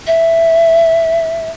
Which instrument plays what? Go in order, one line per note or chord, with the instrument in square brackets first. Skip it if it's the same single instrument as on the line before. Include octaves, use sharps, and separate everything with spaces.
[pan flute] E5